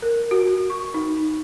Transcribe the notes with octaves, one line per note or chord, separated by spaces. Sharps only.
A#4
F#4
C#6
D#4